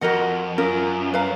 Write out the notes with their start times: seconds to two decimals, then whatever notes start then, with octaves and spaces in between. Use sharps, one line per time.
0.01 F2 F#4 A#4 D#5 F#5
0.58 F#2 C#4 F4 A#4
1.14 B4 F5 A#5